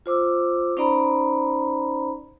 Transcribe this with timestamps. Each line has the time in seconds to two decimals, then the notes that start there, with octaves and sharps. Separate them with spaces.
0.06 F4 C5 D6 E6
0.77 C#4 D#4 C5 D5 A#5 B5